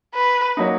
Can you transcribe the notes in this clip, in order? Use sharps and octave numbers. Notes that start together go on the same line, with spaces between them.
B4
F#3 A#3 D#4